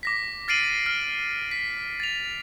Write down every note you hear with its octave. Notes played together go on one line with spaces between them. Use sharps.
D6 A#6 B6
F6 A6 C7 D7 D#7 F#7
F6
B6
A6 F7